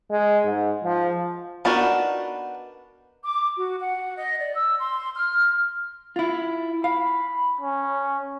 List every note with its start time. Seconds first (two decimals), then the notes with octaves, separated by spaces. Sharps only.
0.11 G#3
0.44 G#2
0.84 F3
1.65 B3 D4 D#4 F#4 A#4
3.24 D6
3.58 F#4
3.81 F#5
4.16 D#5
4.39 D5
4.56 E6
4.80 C6
5.16 F6
6.16 E4 F4
6.84 F5 B5
7.61 C#4